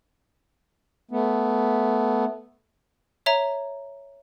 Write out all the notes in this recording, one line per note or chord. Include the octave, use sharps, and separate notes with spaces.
A3 B3
C#5 E5 A#5